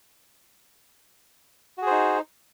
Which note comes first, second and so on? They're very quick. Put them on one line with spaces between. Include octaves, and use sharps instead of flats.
F#4 G#4 C5 D#4